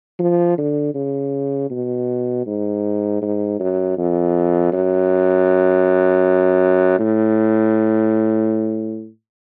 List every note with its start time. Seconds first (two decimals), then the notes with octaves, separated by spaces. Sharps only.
0.19 F3
0.58 D3
0.95 C#3
1.70 B2
2.46 G#2
3.22 G#2
3.60 F#2
3.97 F2
4.73 F#2
6.99 A2